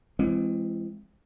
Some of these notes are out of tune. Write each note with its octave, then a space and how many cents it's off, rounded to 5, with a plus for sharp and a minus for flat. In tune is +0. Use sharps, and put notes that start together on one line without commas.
E3 +35 G#3 +0 C4 +0